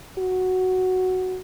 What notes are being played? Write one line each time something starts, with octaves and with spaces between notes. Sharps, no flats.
F#4